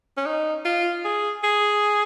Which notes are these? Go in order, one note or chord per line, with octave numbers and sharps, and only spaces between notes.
C#4
D#4
F4
G#4
G#4